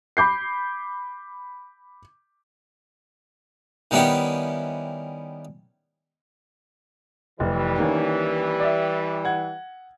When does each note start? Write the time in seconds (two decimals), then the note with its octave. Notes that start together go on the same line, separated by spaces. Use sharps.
0.17 B5 D6 G6 C7
3.91 D#3 G3 B3 C#4 E4 G4
7.40 F1 E3 G3
7.78 D#3 A#3 C#4
8.60 D5 E5
9.25 F#5 G#6